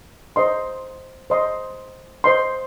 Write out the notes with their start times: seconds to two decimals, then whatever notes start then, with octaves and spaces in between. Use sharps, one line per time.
0.36 C5 D#5 C6
1.30 C5 D#5 C6
2.24 C5 D#5 C6